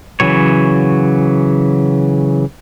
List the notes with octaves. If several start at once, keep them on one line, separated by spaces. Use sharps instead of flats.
C#3 E3 F#3 C#5